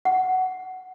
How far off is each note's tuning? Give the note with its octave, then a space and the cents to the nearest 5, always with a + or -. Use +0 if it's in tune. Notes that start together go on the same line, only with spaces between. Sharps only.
F#5 +5